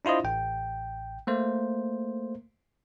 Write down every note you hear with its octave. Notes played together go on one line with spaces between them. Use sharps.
D4 E4 F4 C5 D#5
A1 G5
A3 A#3 C5